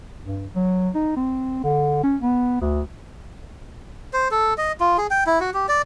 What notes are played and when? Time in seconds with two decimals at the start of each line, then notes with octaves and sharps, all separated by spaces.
0.23 G2
0.56 F#3
0.95 D#4
1.16 C4
1.63 D3
2.03 C#4
2.22 B3
2.61 D2
4.13 C5
4.31 A4
4.58 D#5
4.80 F4
4.98 G#4
5.11 G5
5.27 E4
5.40 F#4
5.54 G4
5.69 D5